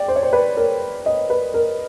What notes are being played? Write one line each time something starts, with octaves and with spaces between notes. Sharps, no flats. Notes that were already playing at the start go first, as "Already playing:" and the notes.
Already playing: D5 G5
C5
C#5
C5
B4
A#4
D#5
B4
A#4